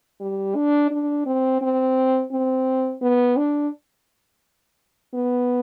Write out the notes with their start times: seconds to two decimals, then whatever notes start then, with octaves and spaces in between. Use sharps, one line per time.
0.21 G3
0.55 D4
0.90 D4
1.26 C4
1.61 C4
2.32 C4
3.02 B3
3.37 D4
5.14 B3